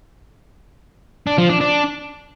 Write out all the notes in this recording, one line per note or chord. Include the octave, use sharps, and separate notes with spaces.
D4
F3
D4
D4